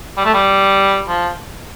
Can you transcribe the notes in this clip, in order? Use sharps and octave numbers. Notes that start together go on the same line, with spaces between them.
G3
A3
G3
F3